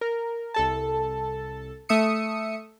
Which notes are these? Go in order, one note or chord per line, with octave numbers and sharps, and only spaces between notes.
A#4
C2 A4 A5
A3 E5 D#6 C#7